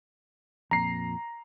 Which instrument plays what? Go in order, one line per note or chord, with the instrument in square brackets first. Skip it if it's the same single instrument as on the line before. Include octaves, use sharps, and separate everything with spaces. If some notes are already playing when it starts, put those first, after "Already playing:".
[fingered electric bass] F2 A#2 [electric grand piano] A#5 C7